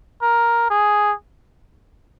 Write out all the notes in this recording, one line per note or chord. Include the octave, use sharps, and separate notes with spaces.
A#4
G#4